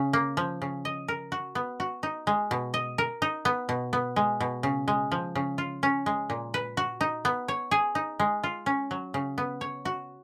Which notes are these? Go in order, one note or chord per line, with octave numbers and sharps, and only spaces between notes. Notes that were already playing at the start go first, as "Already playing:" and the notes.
Already playing: C#3
A#3
F3
C#3
D#5
A#4
F#4
B3
F#4
D#4
G#3
B2
D#5
A#4
D#4
B3
B2
B3
G#3
B2
C#3
G#3
F3
C#3
F4
C#4
G#3
A#2
B4
F#4
D#4
B3
C#5
G#4
D#4
G#3
F4
C#4
F#3
C#3
B3
C#5
F#4